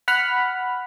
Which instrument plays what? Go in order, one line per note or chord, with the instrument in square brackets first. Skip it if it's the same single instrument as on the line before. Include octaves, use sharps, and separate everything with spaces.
[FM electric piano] F#5 B5 F6